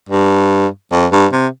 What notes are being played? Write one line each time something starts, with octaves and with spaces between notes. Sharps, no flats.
G2
F2
G2
C3